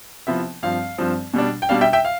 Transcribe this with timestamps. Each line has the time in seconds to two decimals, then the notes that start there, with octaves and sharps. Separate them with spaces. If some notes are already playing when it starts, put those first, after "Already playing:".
0.27 C3 F3 B3 E4 E5
0.63 G2 F3 C4 F5
0.98 G2 F3 C4
1.34 B2 G3 D4
1.62 G5
1.69 B2 G3 D4 F5
1.81 E5 G5
1.93 E5 G5
2.05 F5